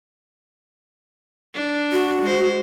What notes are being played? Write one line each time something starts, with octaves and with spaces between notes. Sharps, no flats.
D4
F#4
G#3 C5